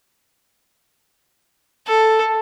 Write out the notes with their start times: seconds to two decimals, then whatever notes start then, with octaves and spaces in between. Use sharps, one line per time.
1.87 A4